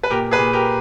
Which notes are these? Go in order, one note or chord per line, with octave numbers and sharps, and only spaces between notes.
B4
A#2 G4 A#4
G#4 B4
A#2
G4 A#4